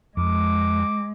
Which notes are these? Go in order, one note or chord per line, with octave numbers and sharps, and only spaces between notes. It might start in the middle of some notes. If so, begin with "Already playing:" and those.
F2 G#3 D6